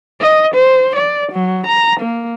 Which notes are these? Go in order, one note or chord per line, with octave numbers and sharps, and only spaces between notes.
D#5
C5
D5
F#3
A#5
A#3